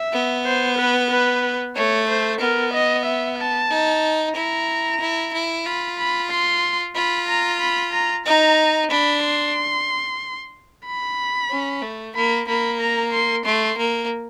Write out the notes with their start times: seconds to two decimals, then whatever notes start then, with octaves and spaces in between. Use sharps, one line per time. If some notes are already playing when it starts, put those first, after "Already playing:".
Already playing: E5
0.13 B3
0.46 C5
0.78 B4
1.11 B4
1.76 A3 C#5
2.08 C5
2.40 B3 A#4
2.73 D#5
3.06 E5
3.38 A5
3.70 D#4
4.35 E4 A#5
5.01 E4
5.33 E4
5.66 F4 B5
5.98 B5
6.30 C6
6.96 F4 B5
7.28 A#5
7.60 B5
7.93 A#5
8.25 D#4 A#5
8.90 D4 B5
9.23 C6
10.86 B5
11.51 C#4
11.82 A3
12.15 A#3 B5
12.48 A#3 B5
12.81 A#5
13.12 C6
13.45 A3 C6
13.77 A#3